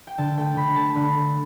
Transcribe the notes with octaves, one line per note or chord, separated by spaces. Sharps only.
G5
D3 A5
A3 G5
D3 B5
A3 A5
D3 B5
A3